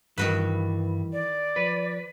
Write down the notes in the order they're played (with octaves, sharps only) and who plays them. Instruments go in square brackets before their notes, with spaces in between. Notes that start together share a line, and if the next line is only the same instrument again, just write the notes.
[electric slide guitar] G2 G3 [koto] D#3 F#4 B4 [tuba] E3
[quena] D5
[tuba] F3 [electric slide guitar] B4